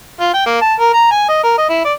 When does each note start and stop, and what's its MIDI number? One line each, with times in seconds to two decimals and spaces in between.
0.20 0.30 65
0.34 0.44 79
0.46 0.60 58
0.61 0.74 81
0.79 0.91 70
0.94 1.09 82
1.11 1.25 80
1.29 1.42 75
1.44 1.54 70
1.58 1.66 75
1.69 1.82 64
1.85 1.92 74